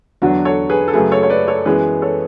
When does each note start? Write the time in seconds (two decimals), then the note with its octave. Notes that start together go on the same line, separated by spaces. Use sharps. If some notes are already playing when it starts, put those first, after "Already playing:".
0.22 E2 D3 F#3 D4 F#4
0.45 A4 C#5
0.70 G#4 B4
0.88 A4
0.93 F#2 C#3 F#3 A3 G#4 B4
1.11 A4 C#5
1.23 C#5
1.30 B4 D5
1.48 A4 C#5
1.65 F#2 E3 G#3 B3 G#4 B4
2.02 A4 C#5